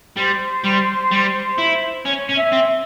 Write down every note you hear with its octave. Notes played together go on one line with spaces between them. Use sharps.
G3 C5
G3
G3
E4
C#4 C#5
C#4
E5
C4